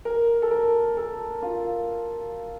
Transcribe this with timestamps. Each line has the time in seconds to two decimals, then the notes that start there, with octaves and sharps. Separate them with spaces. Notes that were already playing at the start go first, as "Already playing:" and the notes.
0.05 A#4
0.42 A4
0.51 A#4
0.97 A4
1.42 F4